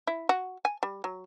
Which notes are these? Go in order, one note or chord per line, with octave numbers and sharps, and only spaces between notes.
E4
F#4
G#5
G3
F#3